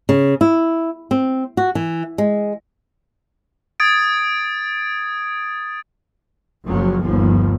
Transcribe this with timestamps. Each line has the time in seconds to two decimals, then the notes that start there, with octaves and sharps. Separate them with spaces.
0.09 C#3
0.41 E4
1.11 C4
1.57 F#4
1.75 E3
2.18 G#3
3.80 D#6 G#6 A6 D7
6.64 F#1 F3 F#3
7.02 G1 D#2 F3